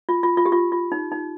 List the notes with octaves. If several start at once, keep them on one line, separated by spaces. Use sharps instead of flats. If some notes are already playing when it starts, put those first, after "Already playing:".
F4
F4
F4
G4
F4
F4
D#4
D#4